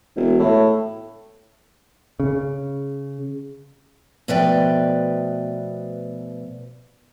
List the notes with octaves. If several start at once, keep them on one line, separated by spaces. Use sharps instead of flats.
E1
A2
C#3
B2 F3 A3 B4 D5 G5